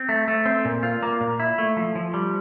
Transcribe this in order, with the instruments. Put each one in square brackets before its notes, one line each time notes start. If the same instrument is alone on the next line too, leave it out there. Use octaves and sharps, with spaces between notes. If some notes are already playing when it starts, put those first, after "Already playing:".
Already playing: [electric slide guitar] C4
A3
A3
C4
A#2
F4
A#3
A#2
E4
A3
F3
F3
G3